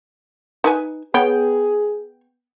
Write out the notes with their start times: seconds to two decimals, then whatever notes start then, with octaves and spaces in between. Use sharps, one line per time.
0.64 D#4 B4 G#5
1.14 B3 G#4 C#5 G5